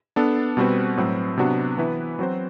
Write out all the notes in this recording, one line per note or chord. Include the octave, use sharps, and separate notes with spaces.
B3 D4 A4
B2 G3 C4 F#4 B4
A2 F#3 C4
C3 F#3 B3 D4 F#4
E3 B3 E4 B4
F#3 C4 F#4 C5